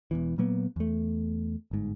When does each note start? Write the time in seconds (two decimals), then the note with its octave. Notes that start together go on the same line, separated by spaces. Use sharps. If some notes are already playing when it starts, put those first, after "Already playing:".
0.11 E1 E2 E3
0.38 A#2 F#3 A#3 B3
0.76 E2 A3
1.71 G1 G#2